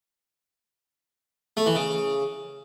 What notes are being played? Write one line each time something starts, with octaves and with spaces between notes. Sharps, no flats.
A3
E3
C#3